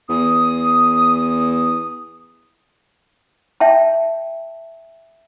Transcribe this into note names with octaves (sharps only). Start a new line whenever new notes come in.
E2 D#6
E5 G5 A5